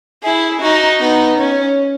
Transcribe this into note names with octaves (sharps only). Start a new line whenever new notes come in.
E4 G#4
D#4 F#4
B3 D#4
C#4